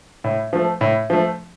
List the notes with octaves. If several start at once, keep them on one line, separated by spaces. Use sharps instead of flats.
A2
F3 A3
A2
F3 A3